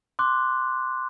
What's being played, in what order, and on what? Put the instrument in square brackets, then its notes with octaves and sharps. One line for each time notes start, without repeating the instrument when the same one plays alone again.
[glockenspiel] C6 D6 F#6